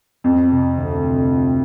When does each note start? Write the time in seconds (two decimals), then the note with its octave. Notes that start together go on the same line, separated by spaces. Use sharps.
0.24 F2 G3
0.51 C3
0.77 D2
1.03 G3
1.30 F4